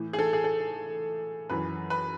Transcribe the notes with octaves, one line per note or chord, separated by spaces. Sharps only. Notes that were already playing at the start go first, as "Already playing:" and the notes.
Already playing: A2 E3
G#4
A4
G#4
A4
F#2 E3 B4
B4